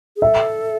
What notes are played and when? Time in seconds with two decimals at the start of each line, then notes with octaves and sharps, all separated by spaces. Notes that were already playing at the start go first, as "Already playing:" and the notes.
0.16 G#4
0.22 A4 E5